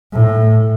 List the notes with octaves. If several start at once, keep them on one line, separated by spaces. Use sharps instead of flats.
A2